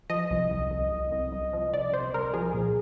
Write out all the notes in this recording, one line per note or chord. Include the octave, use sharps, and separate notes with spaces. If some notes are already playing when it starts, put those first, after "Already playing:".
F3 D#5
C2
C2
C2
C2
C2
C2
F3
C2 D5
C2 C5
C2 A#4
F3 G#4
A#2